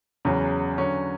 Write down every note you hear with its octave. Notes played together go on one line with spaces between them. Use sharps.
E2 C#3 F#3
D3 F#3 C#4